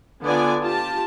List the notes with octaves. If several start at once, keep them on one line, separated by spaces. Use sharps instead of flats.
D3 B3 F4 D5 G#5
F4 G4 A5